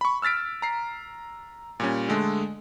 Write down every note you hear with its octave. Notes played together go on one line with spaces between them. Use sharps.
B5 C#6
E6 F6 A6 B6 D7
A#5 C7
A#2 G3 C#4
D3 G#3 A3